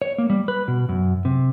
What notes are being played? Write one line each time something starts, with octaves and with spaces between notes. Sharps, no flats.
C#5
A#3
G3
B4
B2
F#2
C3